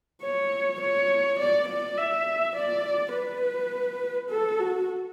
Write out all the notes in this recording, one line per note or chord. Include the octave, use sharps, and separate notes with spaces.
C#5
C#5
D5
D5
E5
D5
B4
A4
F#4